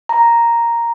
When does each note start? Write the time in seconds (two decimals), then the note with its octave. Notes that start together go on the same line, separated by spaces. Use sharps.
0.09 A#5